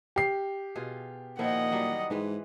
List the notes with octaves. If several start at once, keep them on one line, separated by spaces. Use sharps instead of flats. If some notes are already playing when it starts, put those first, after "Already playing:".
G4 C7
B2 F4 G#4
A#2 D#3 F3 E4 D#5 F#5
F#3 G3
G#2 E3 G#3 B4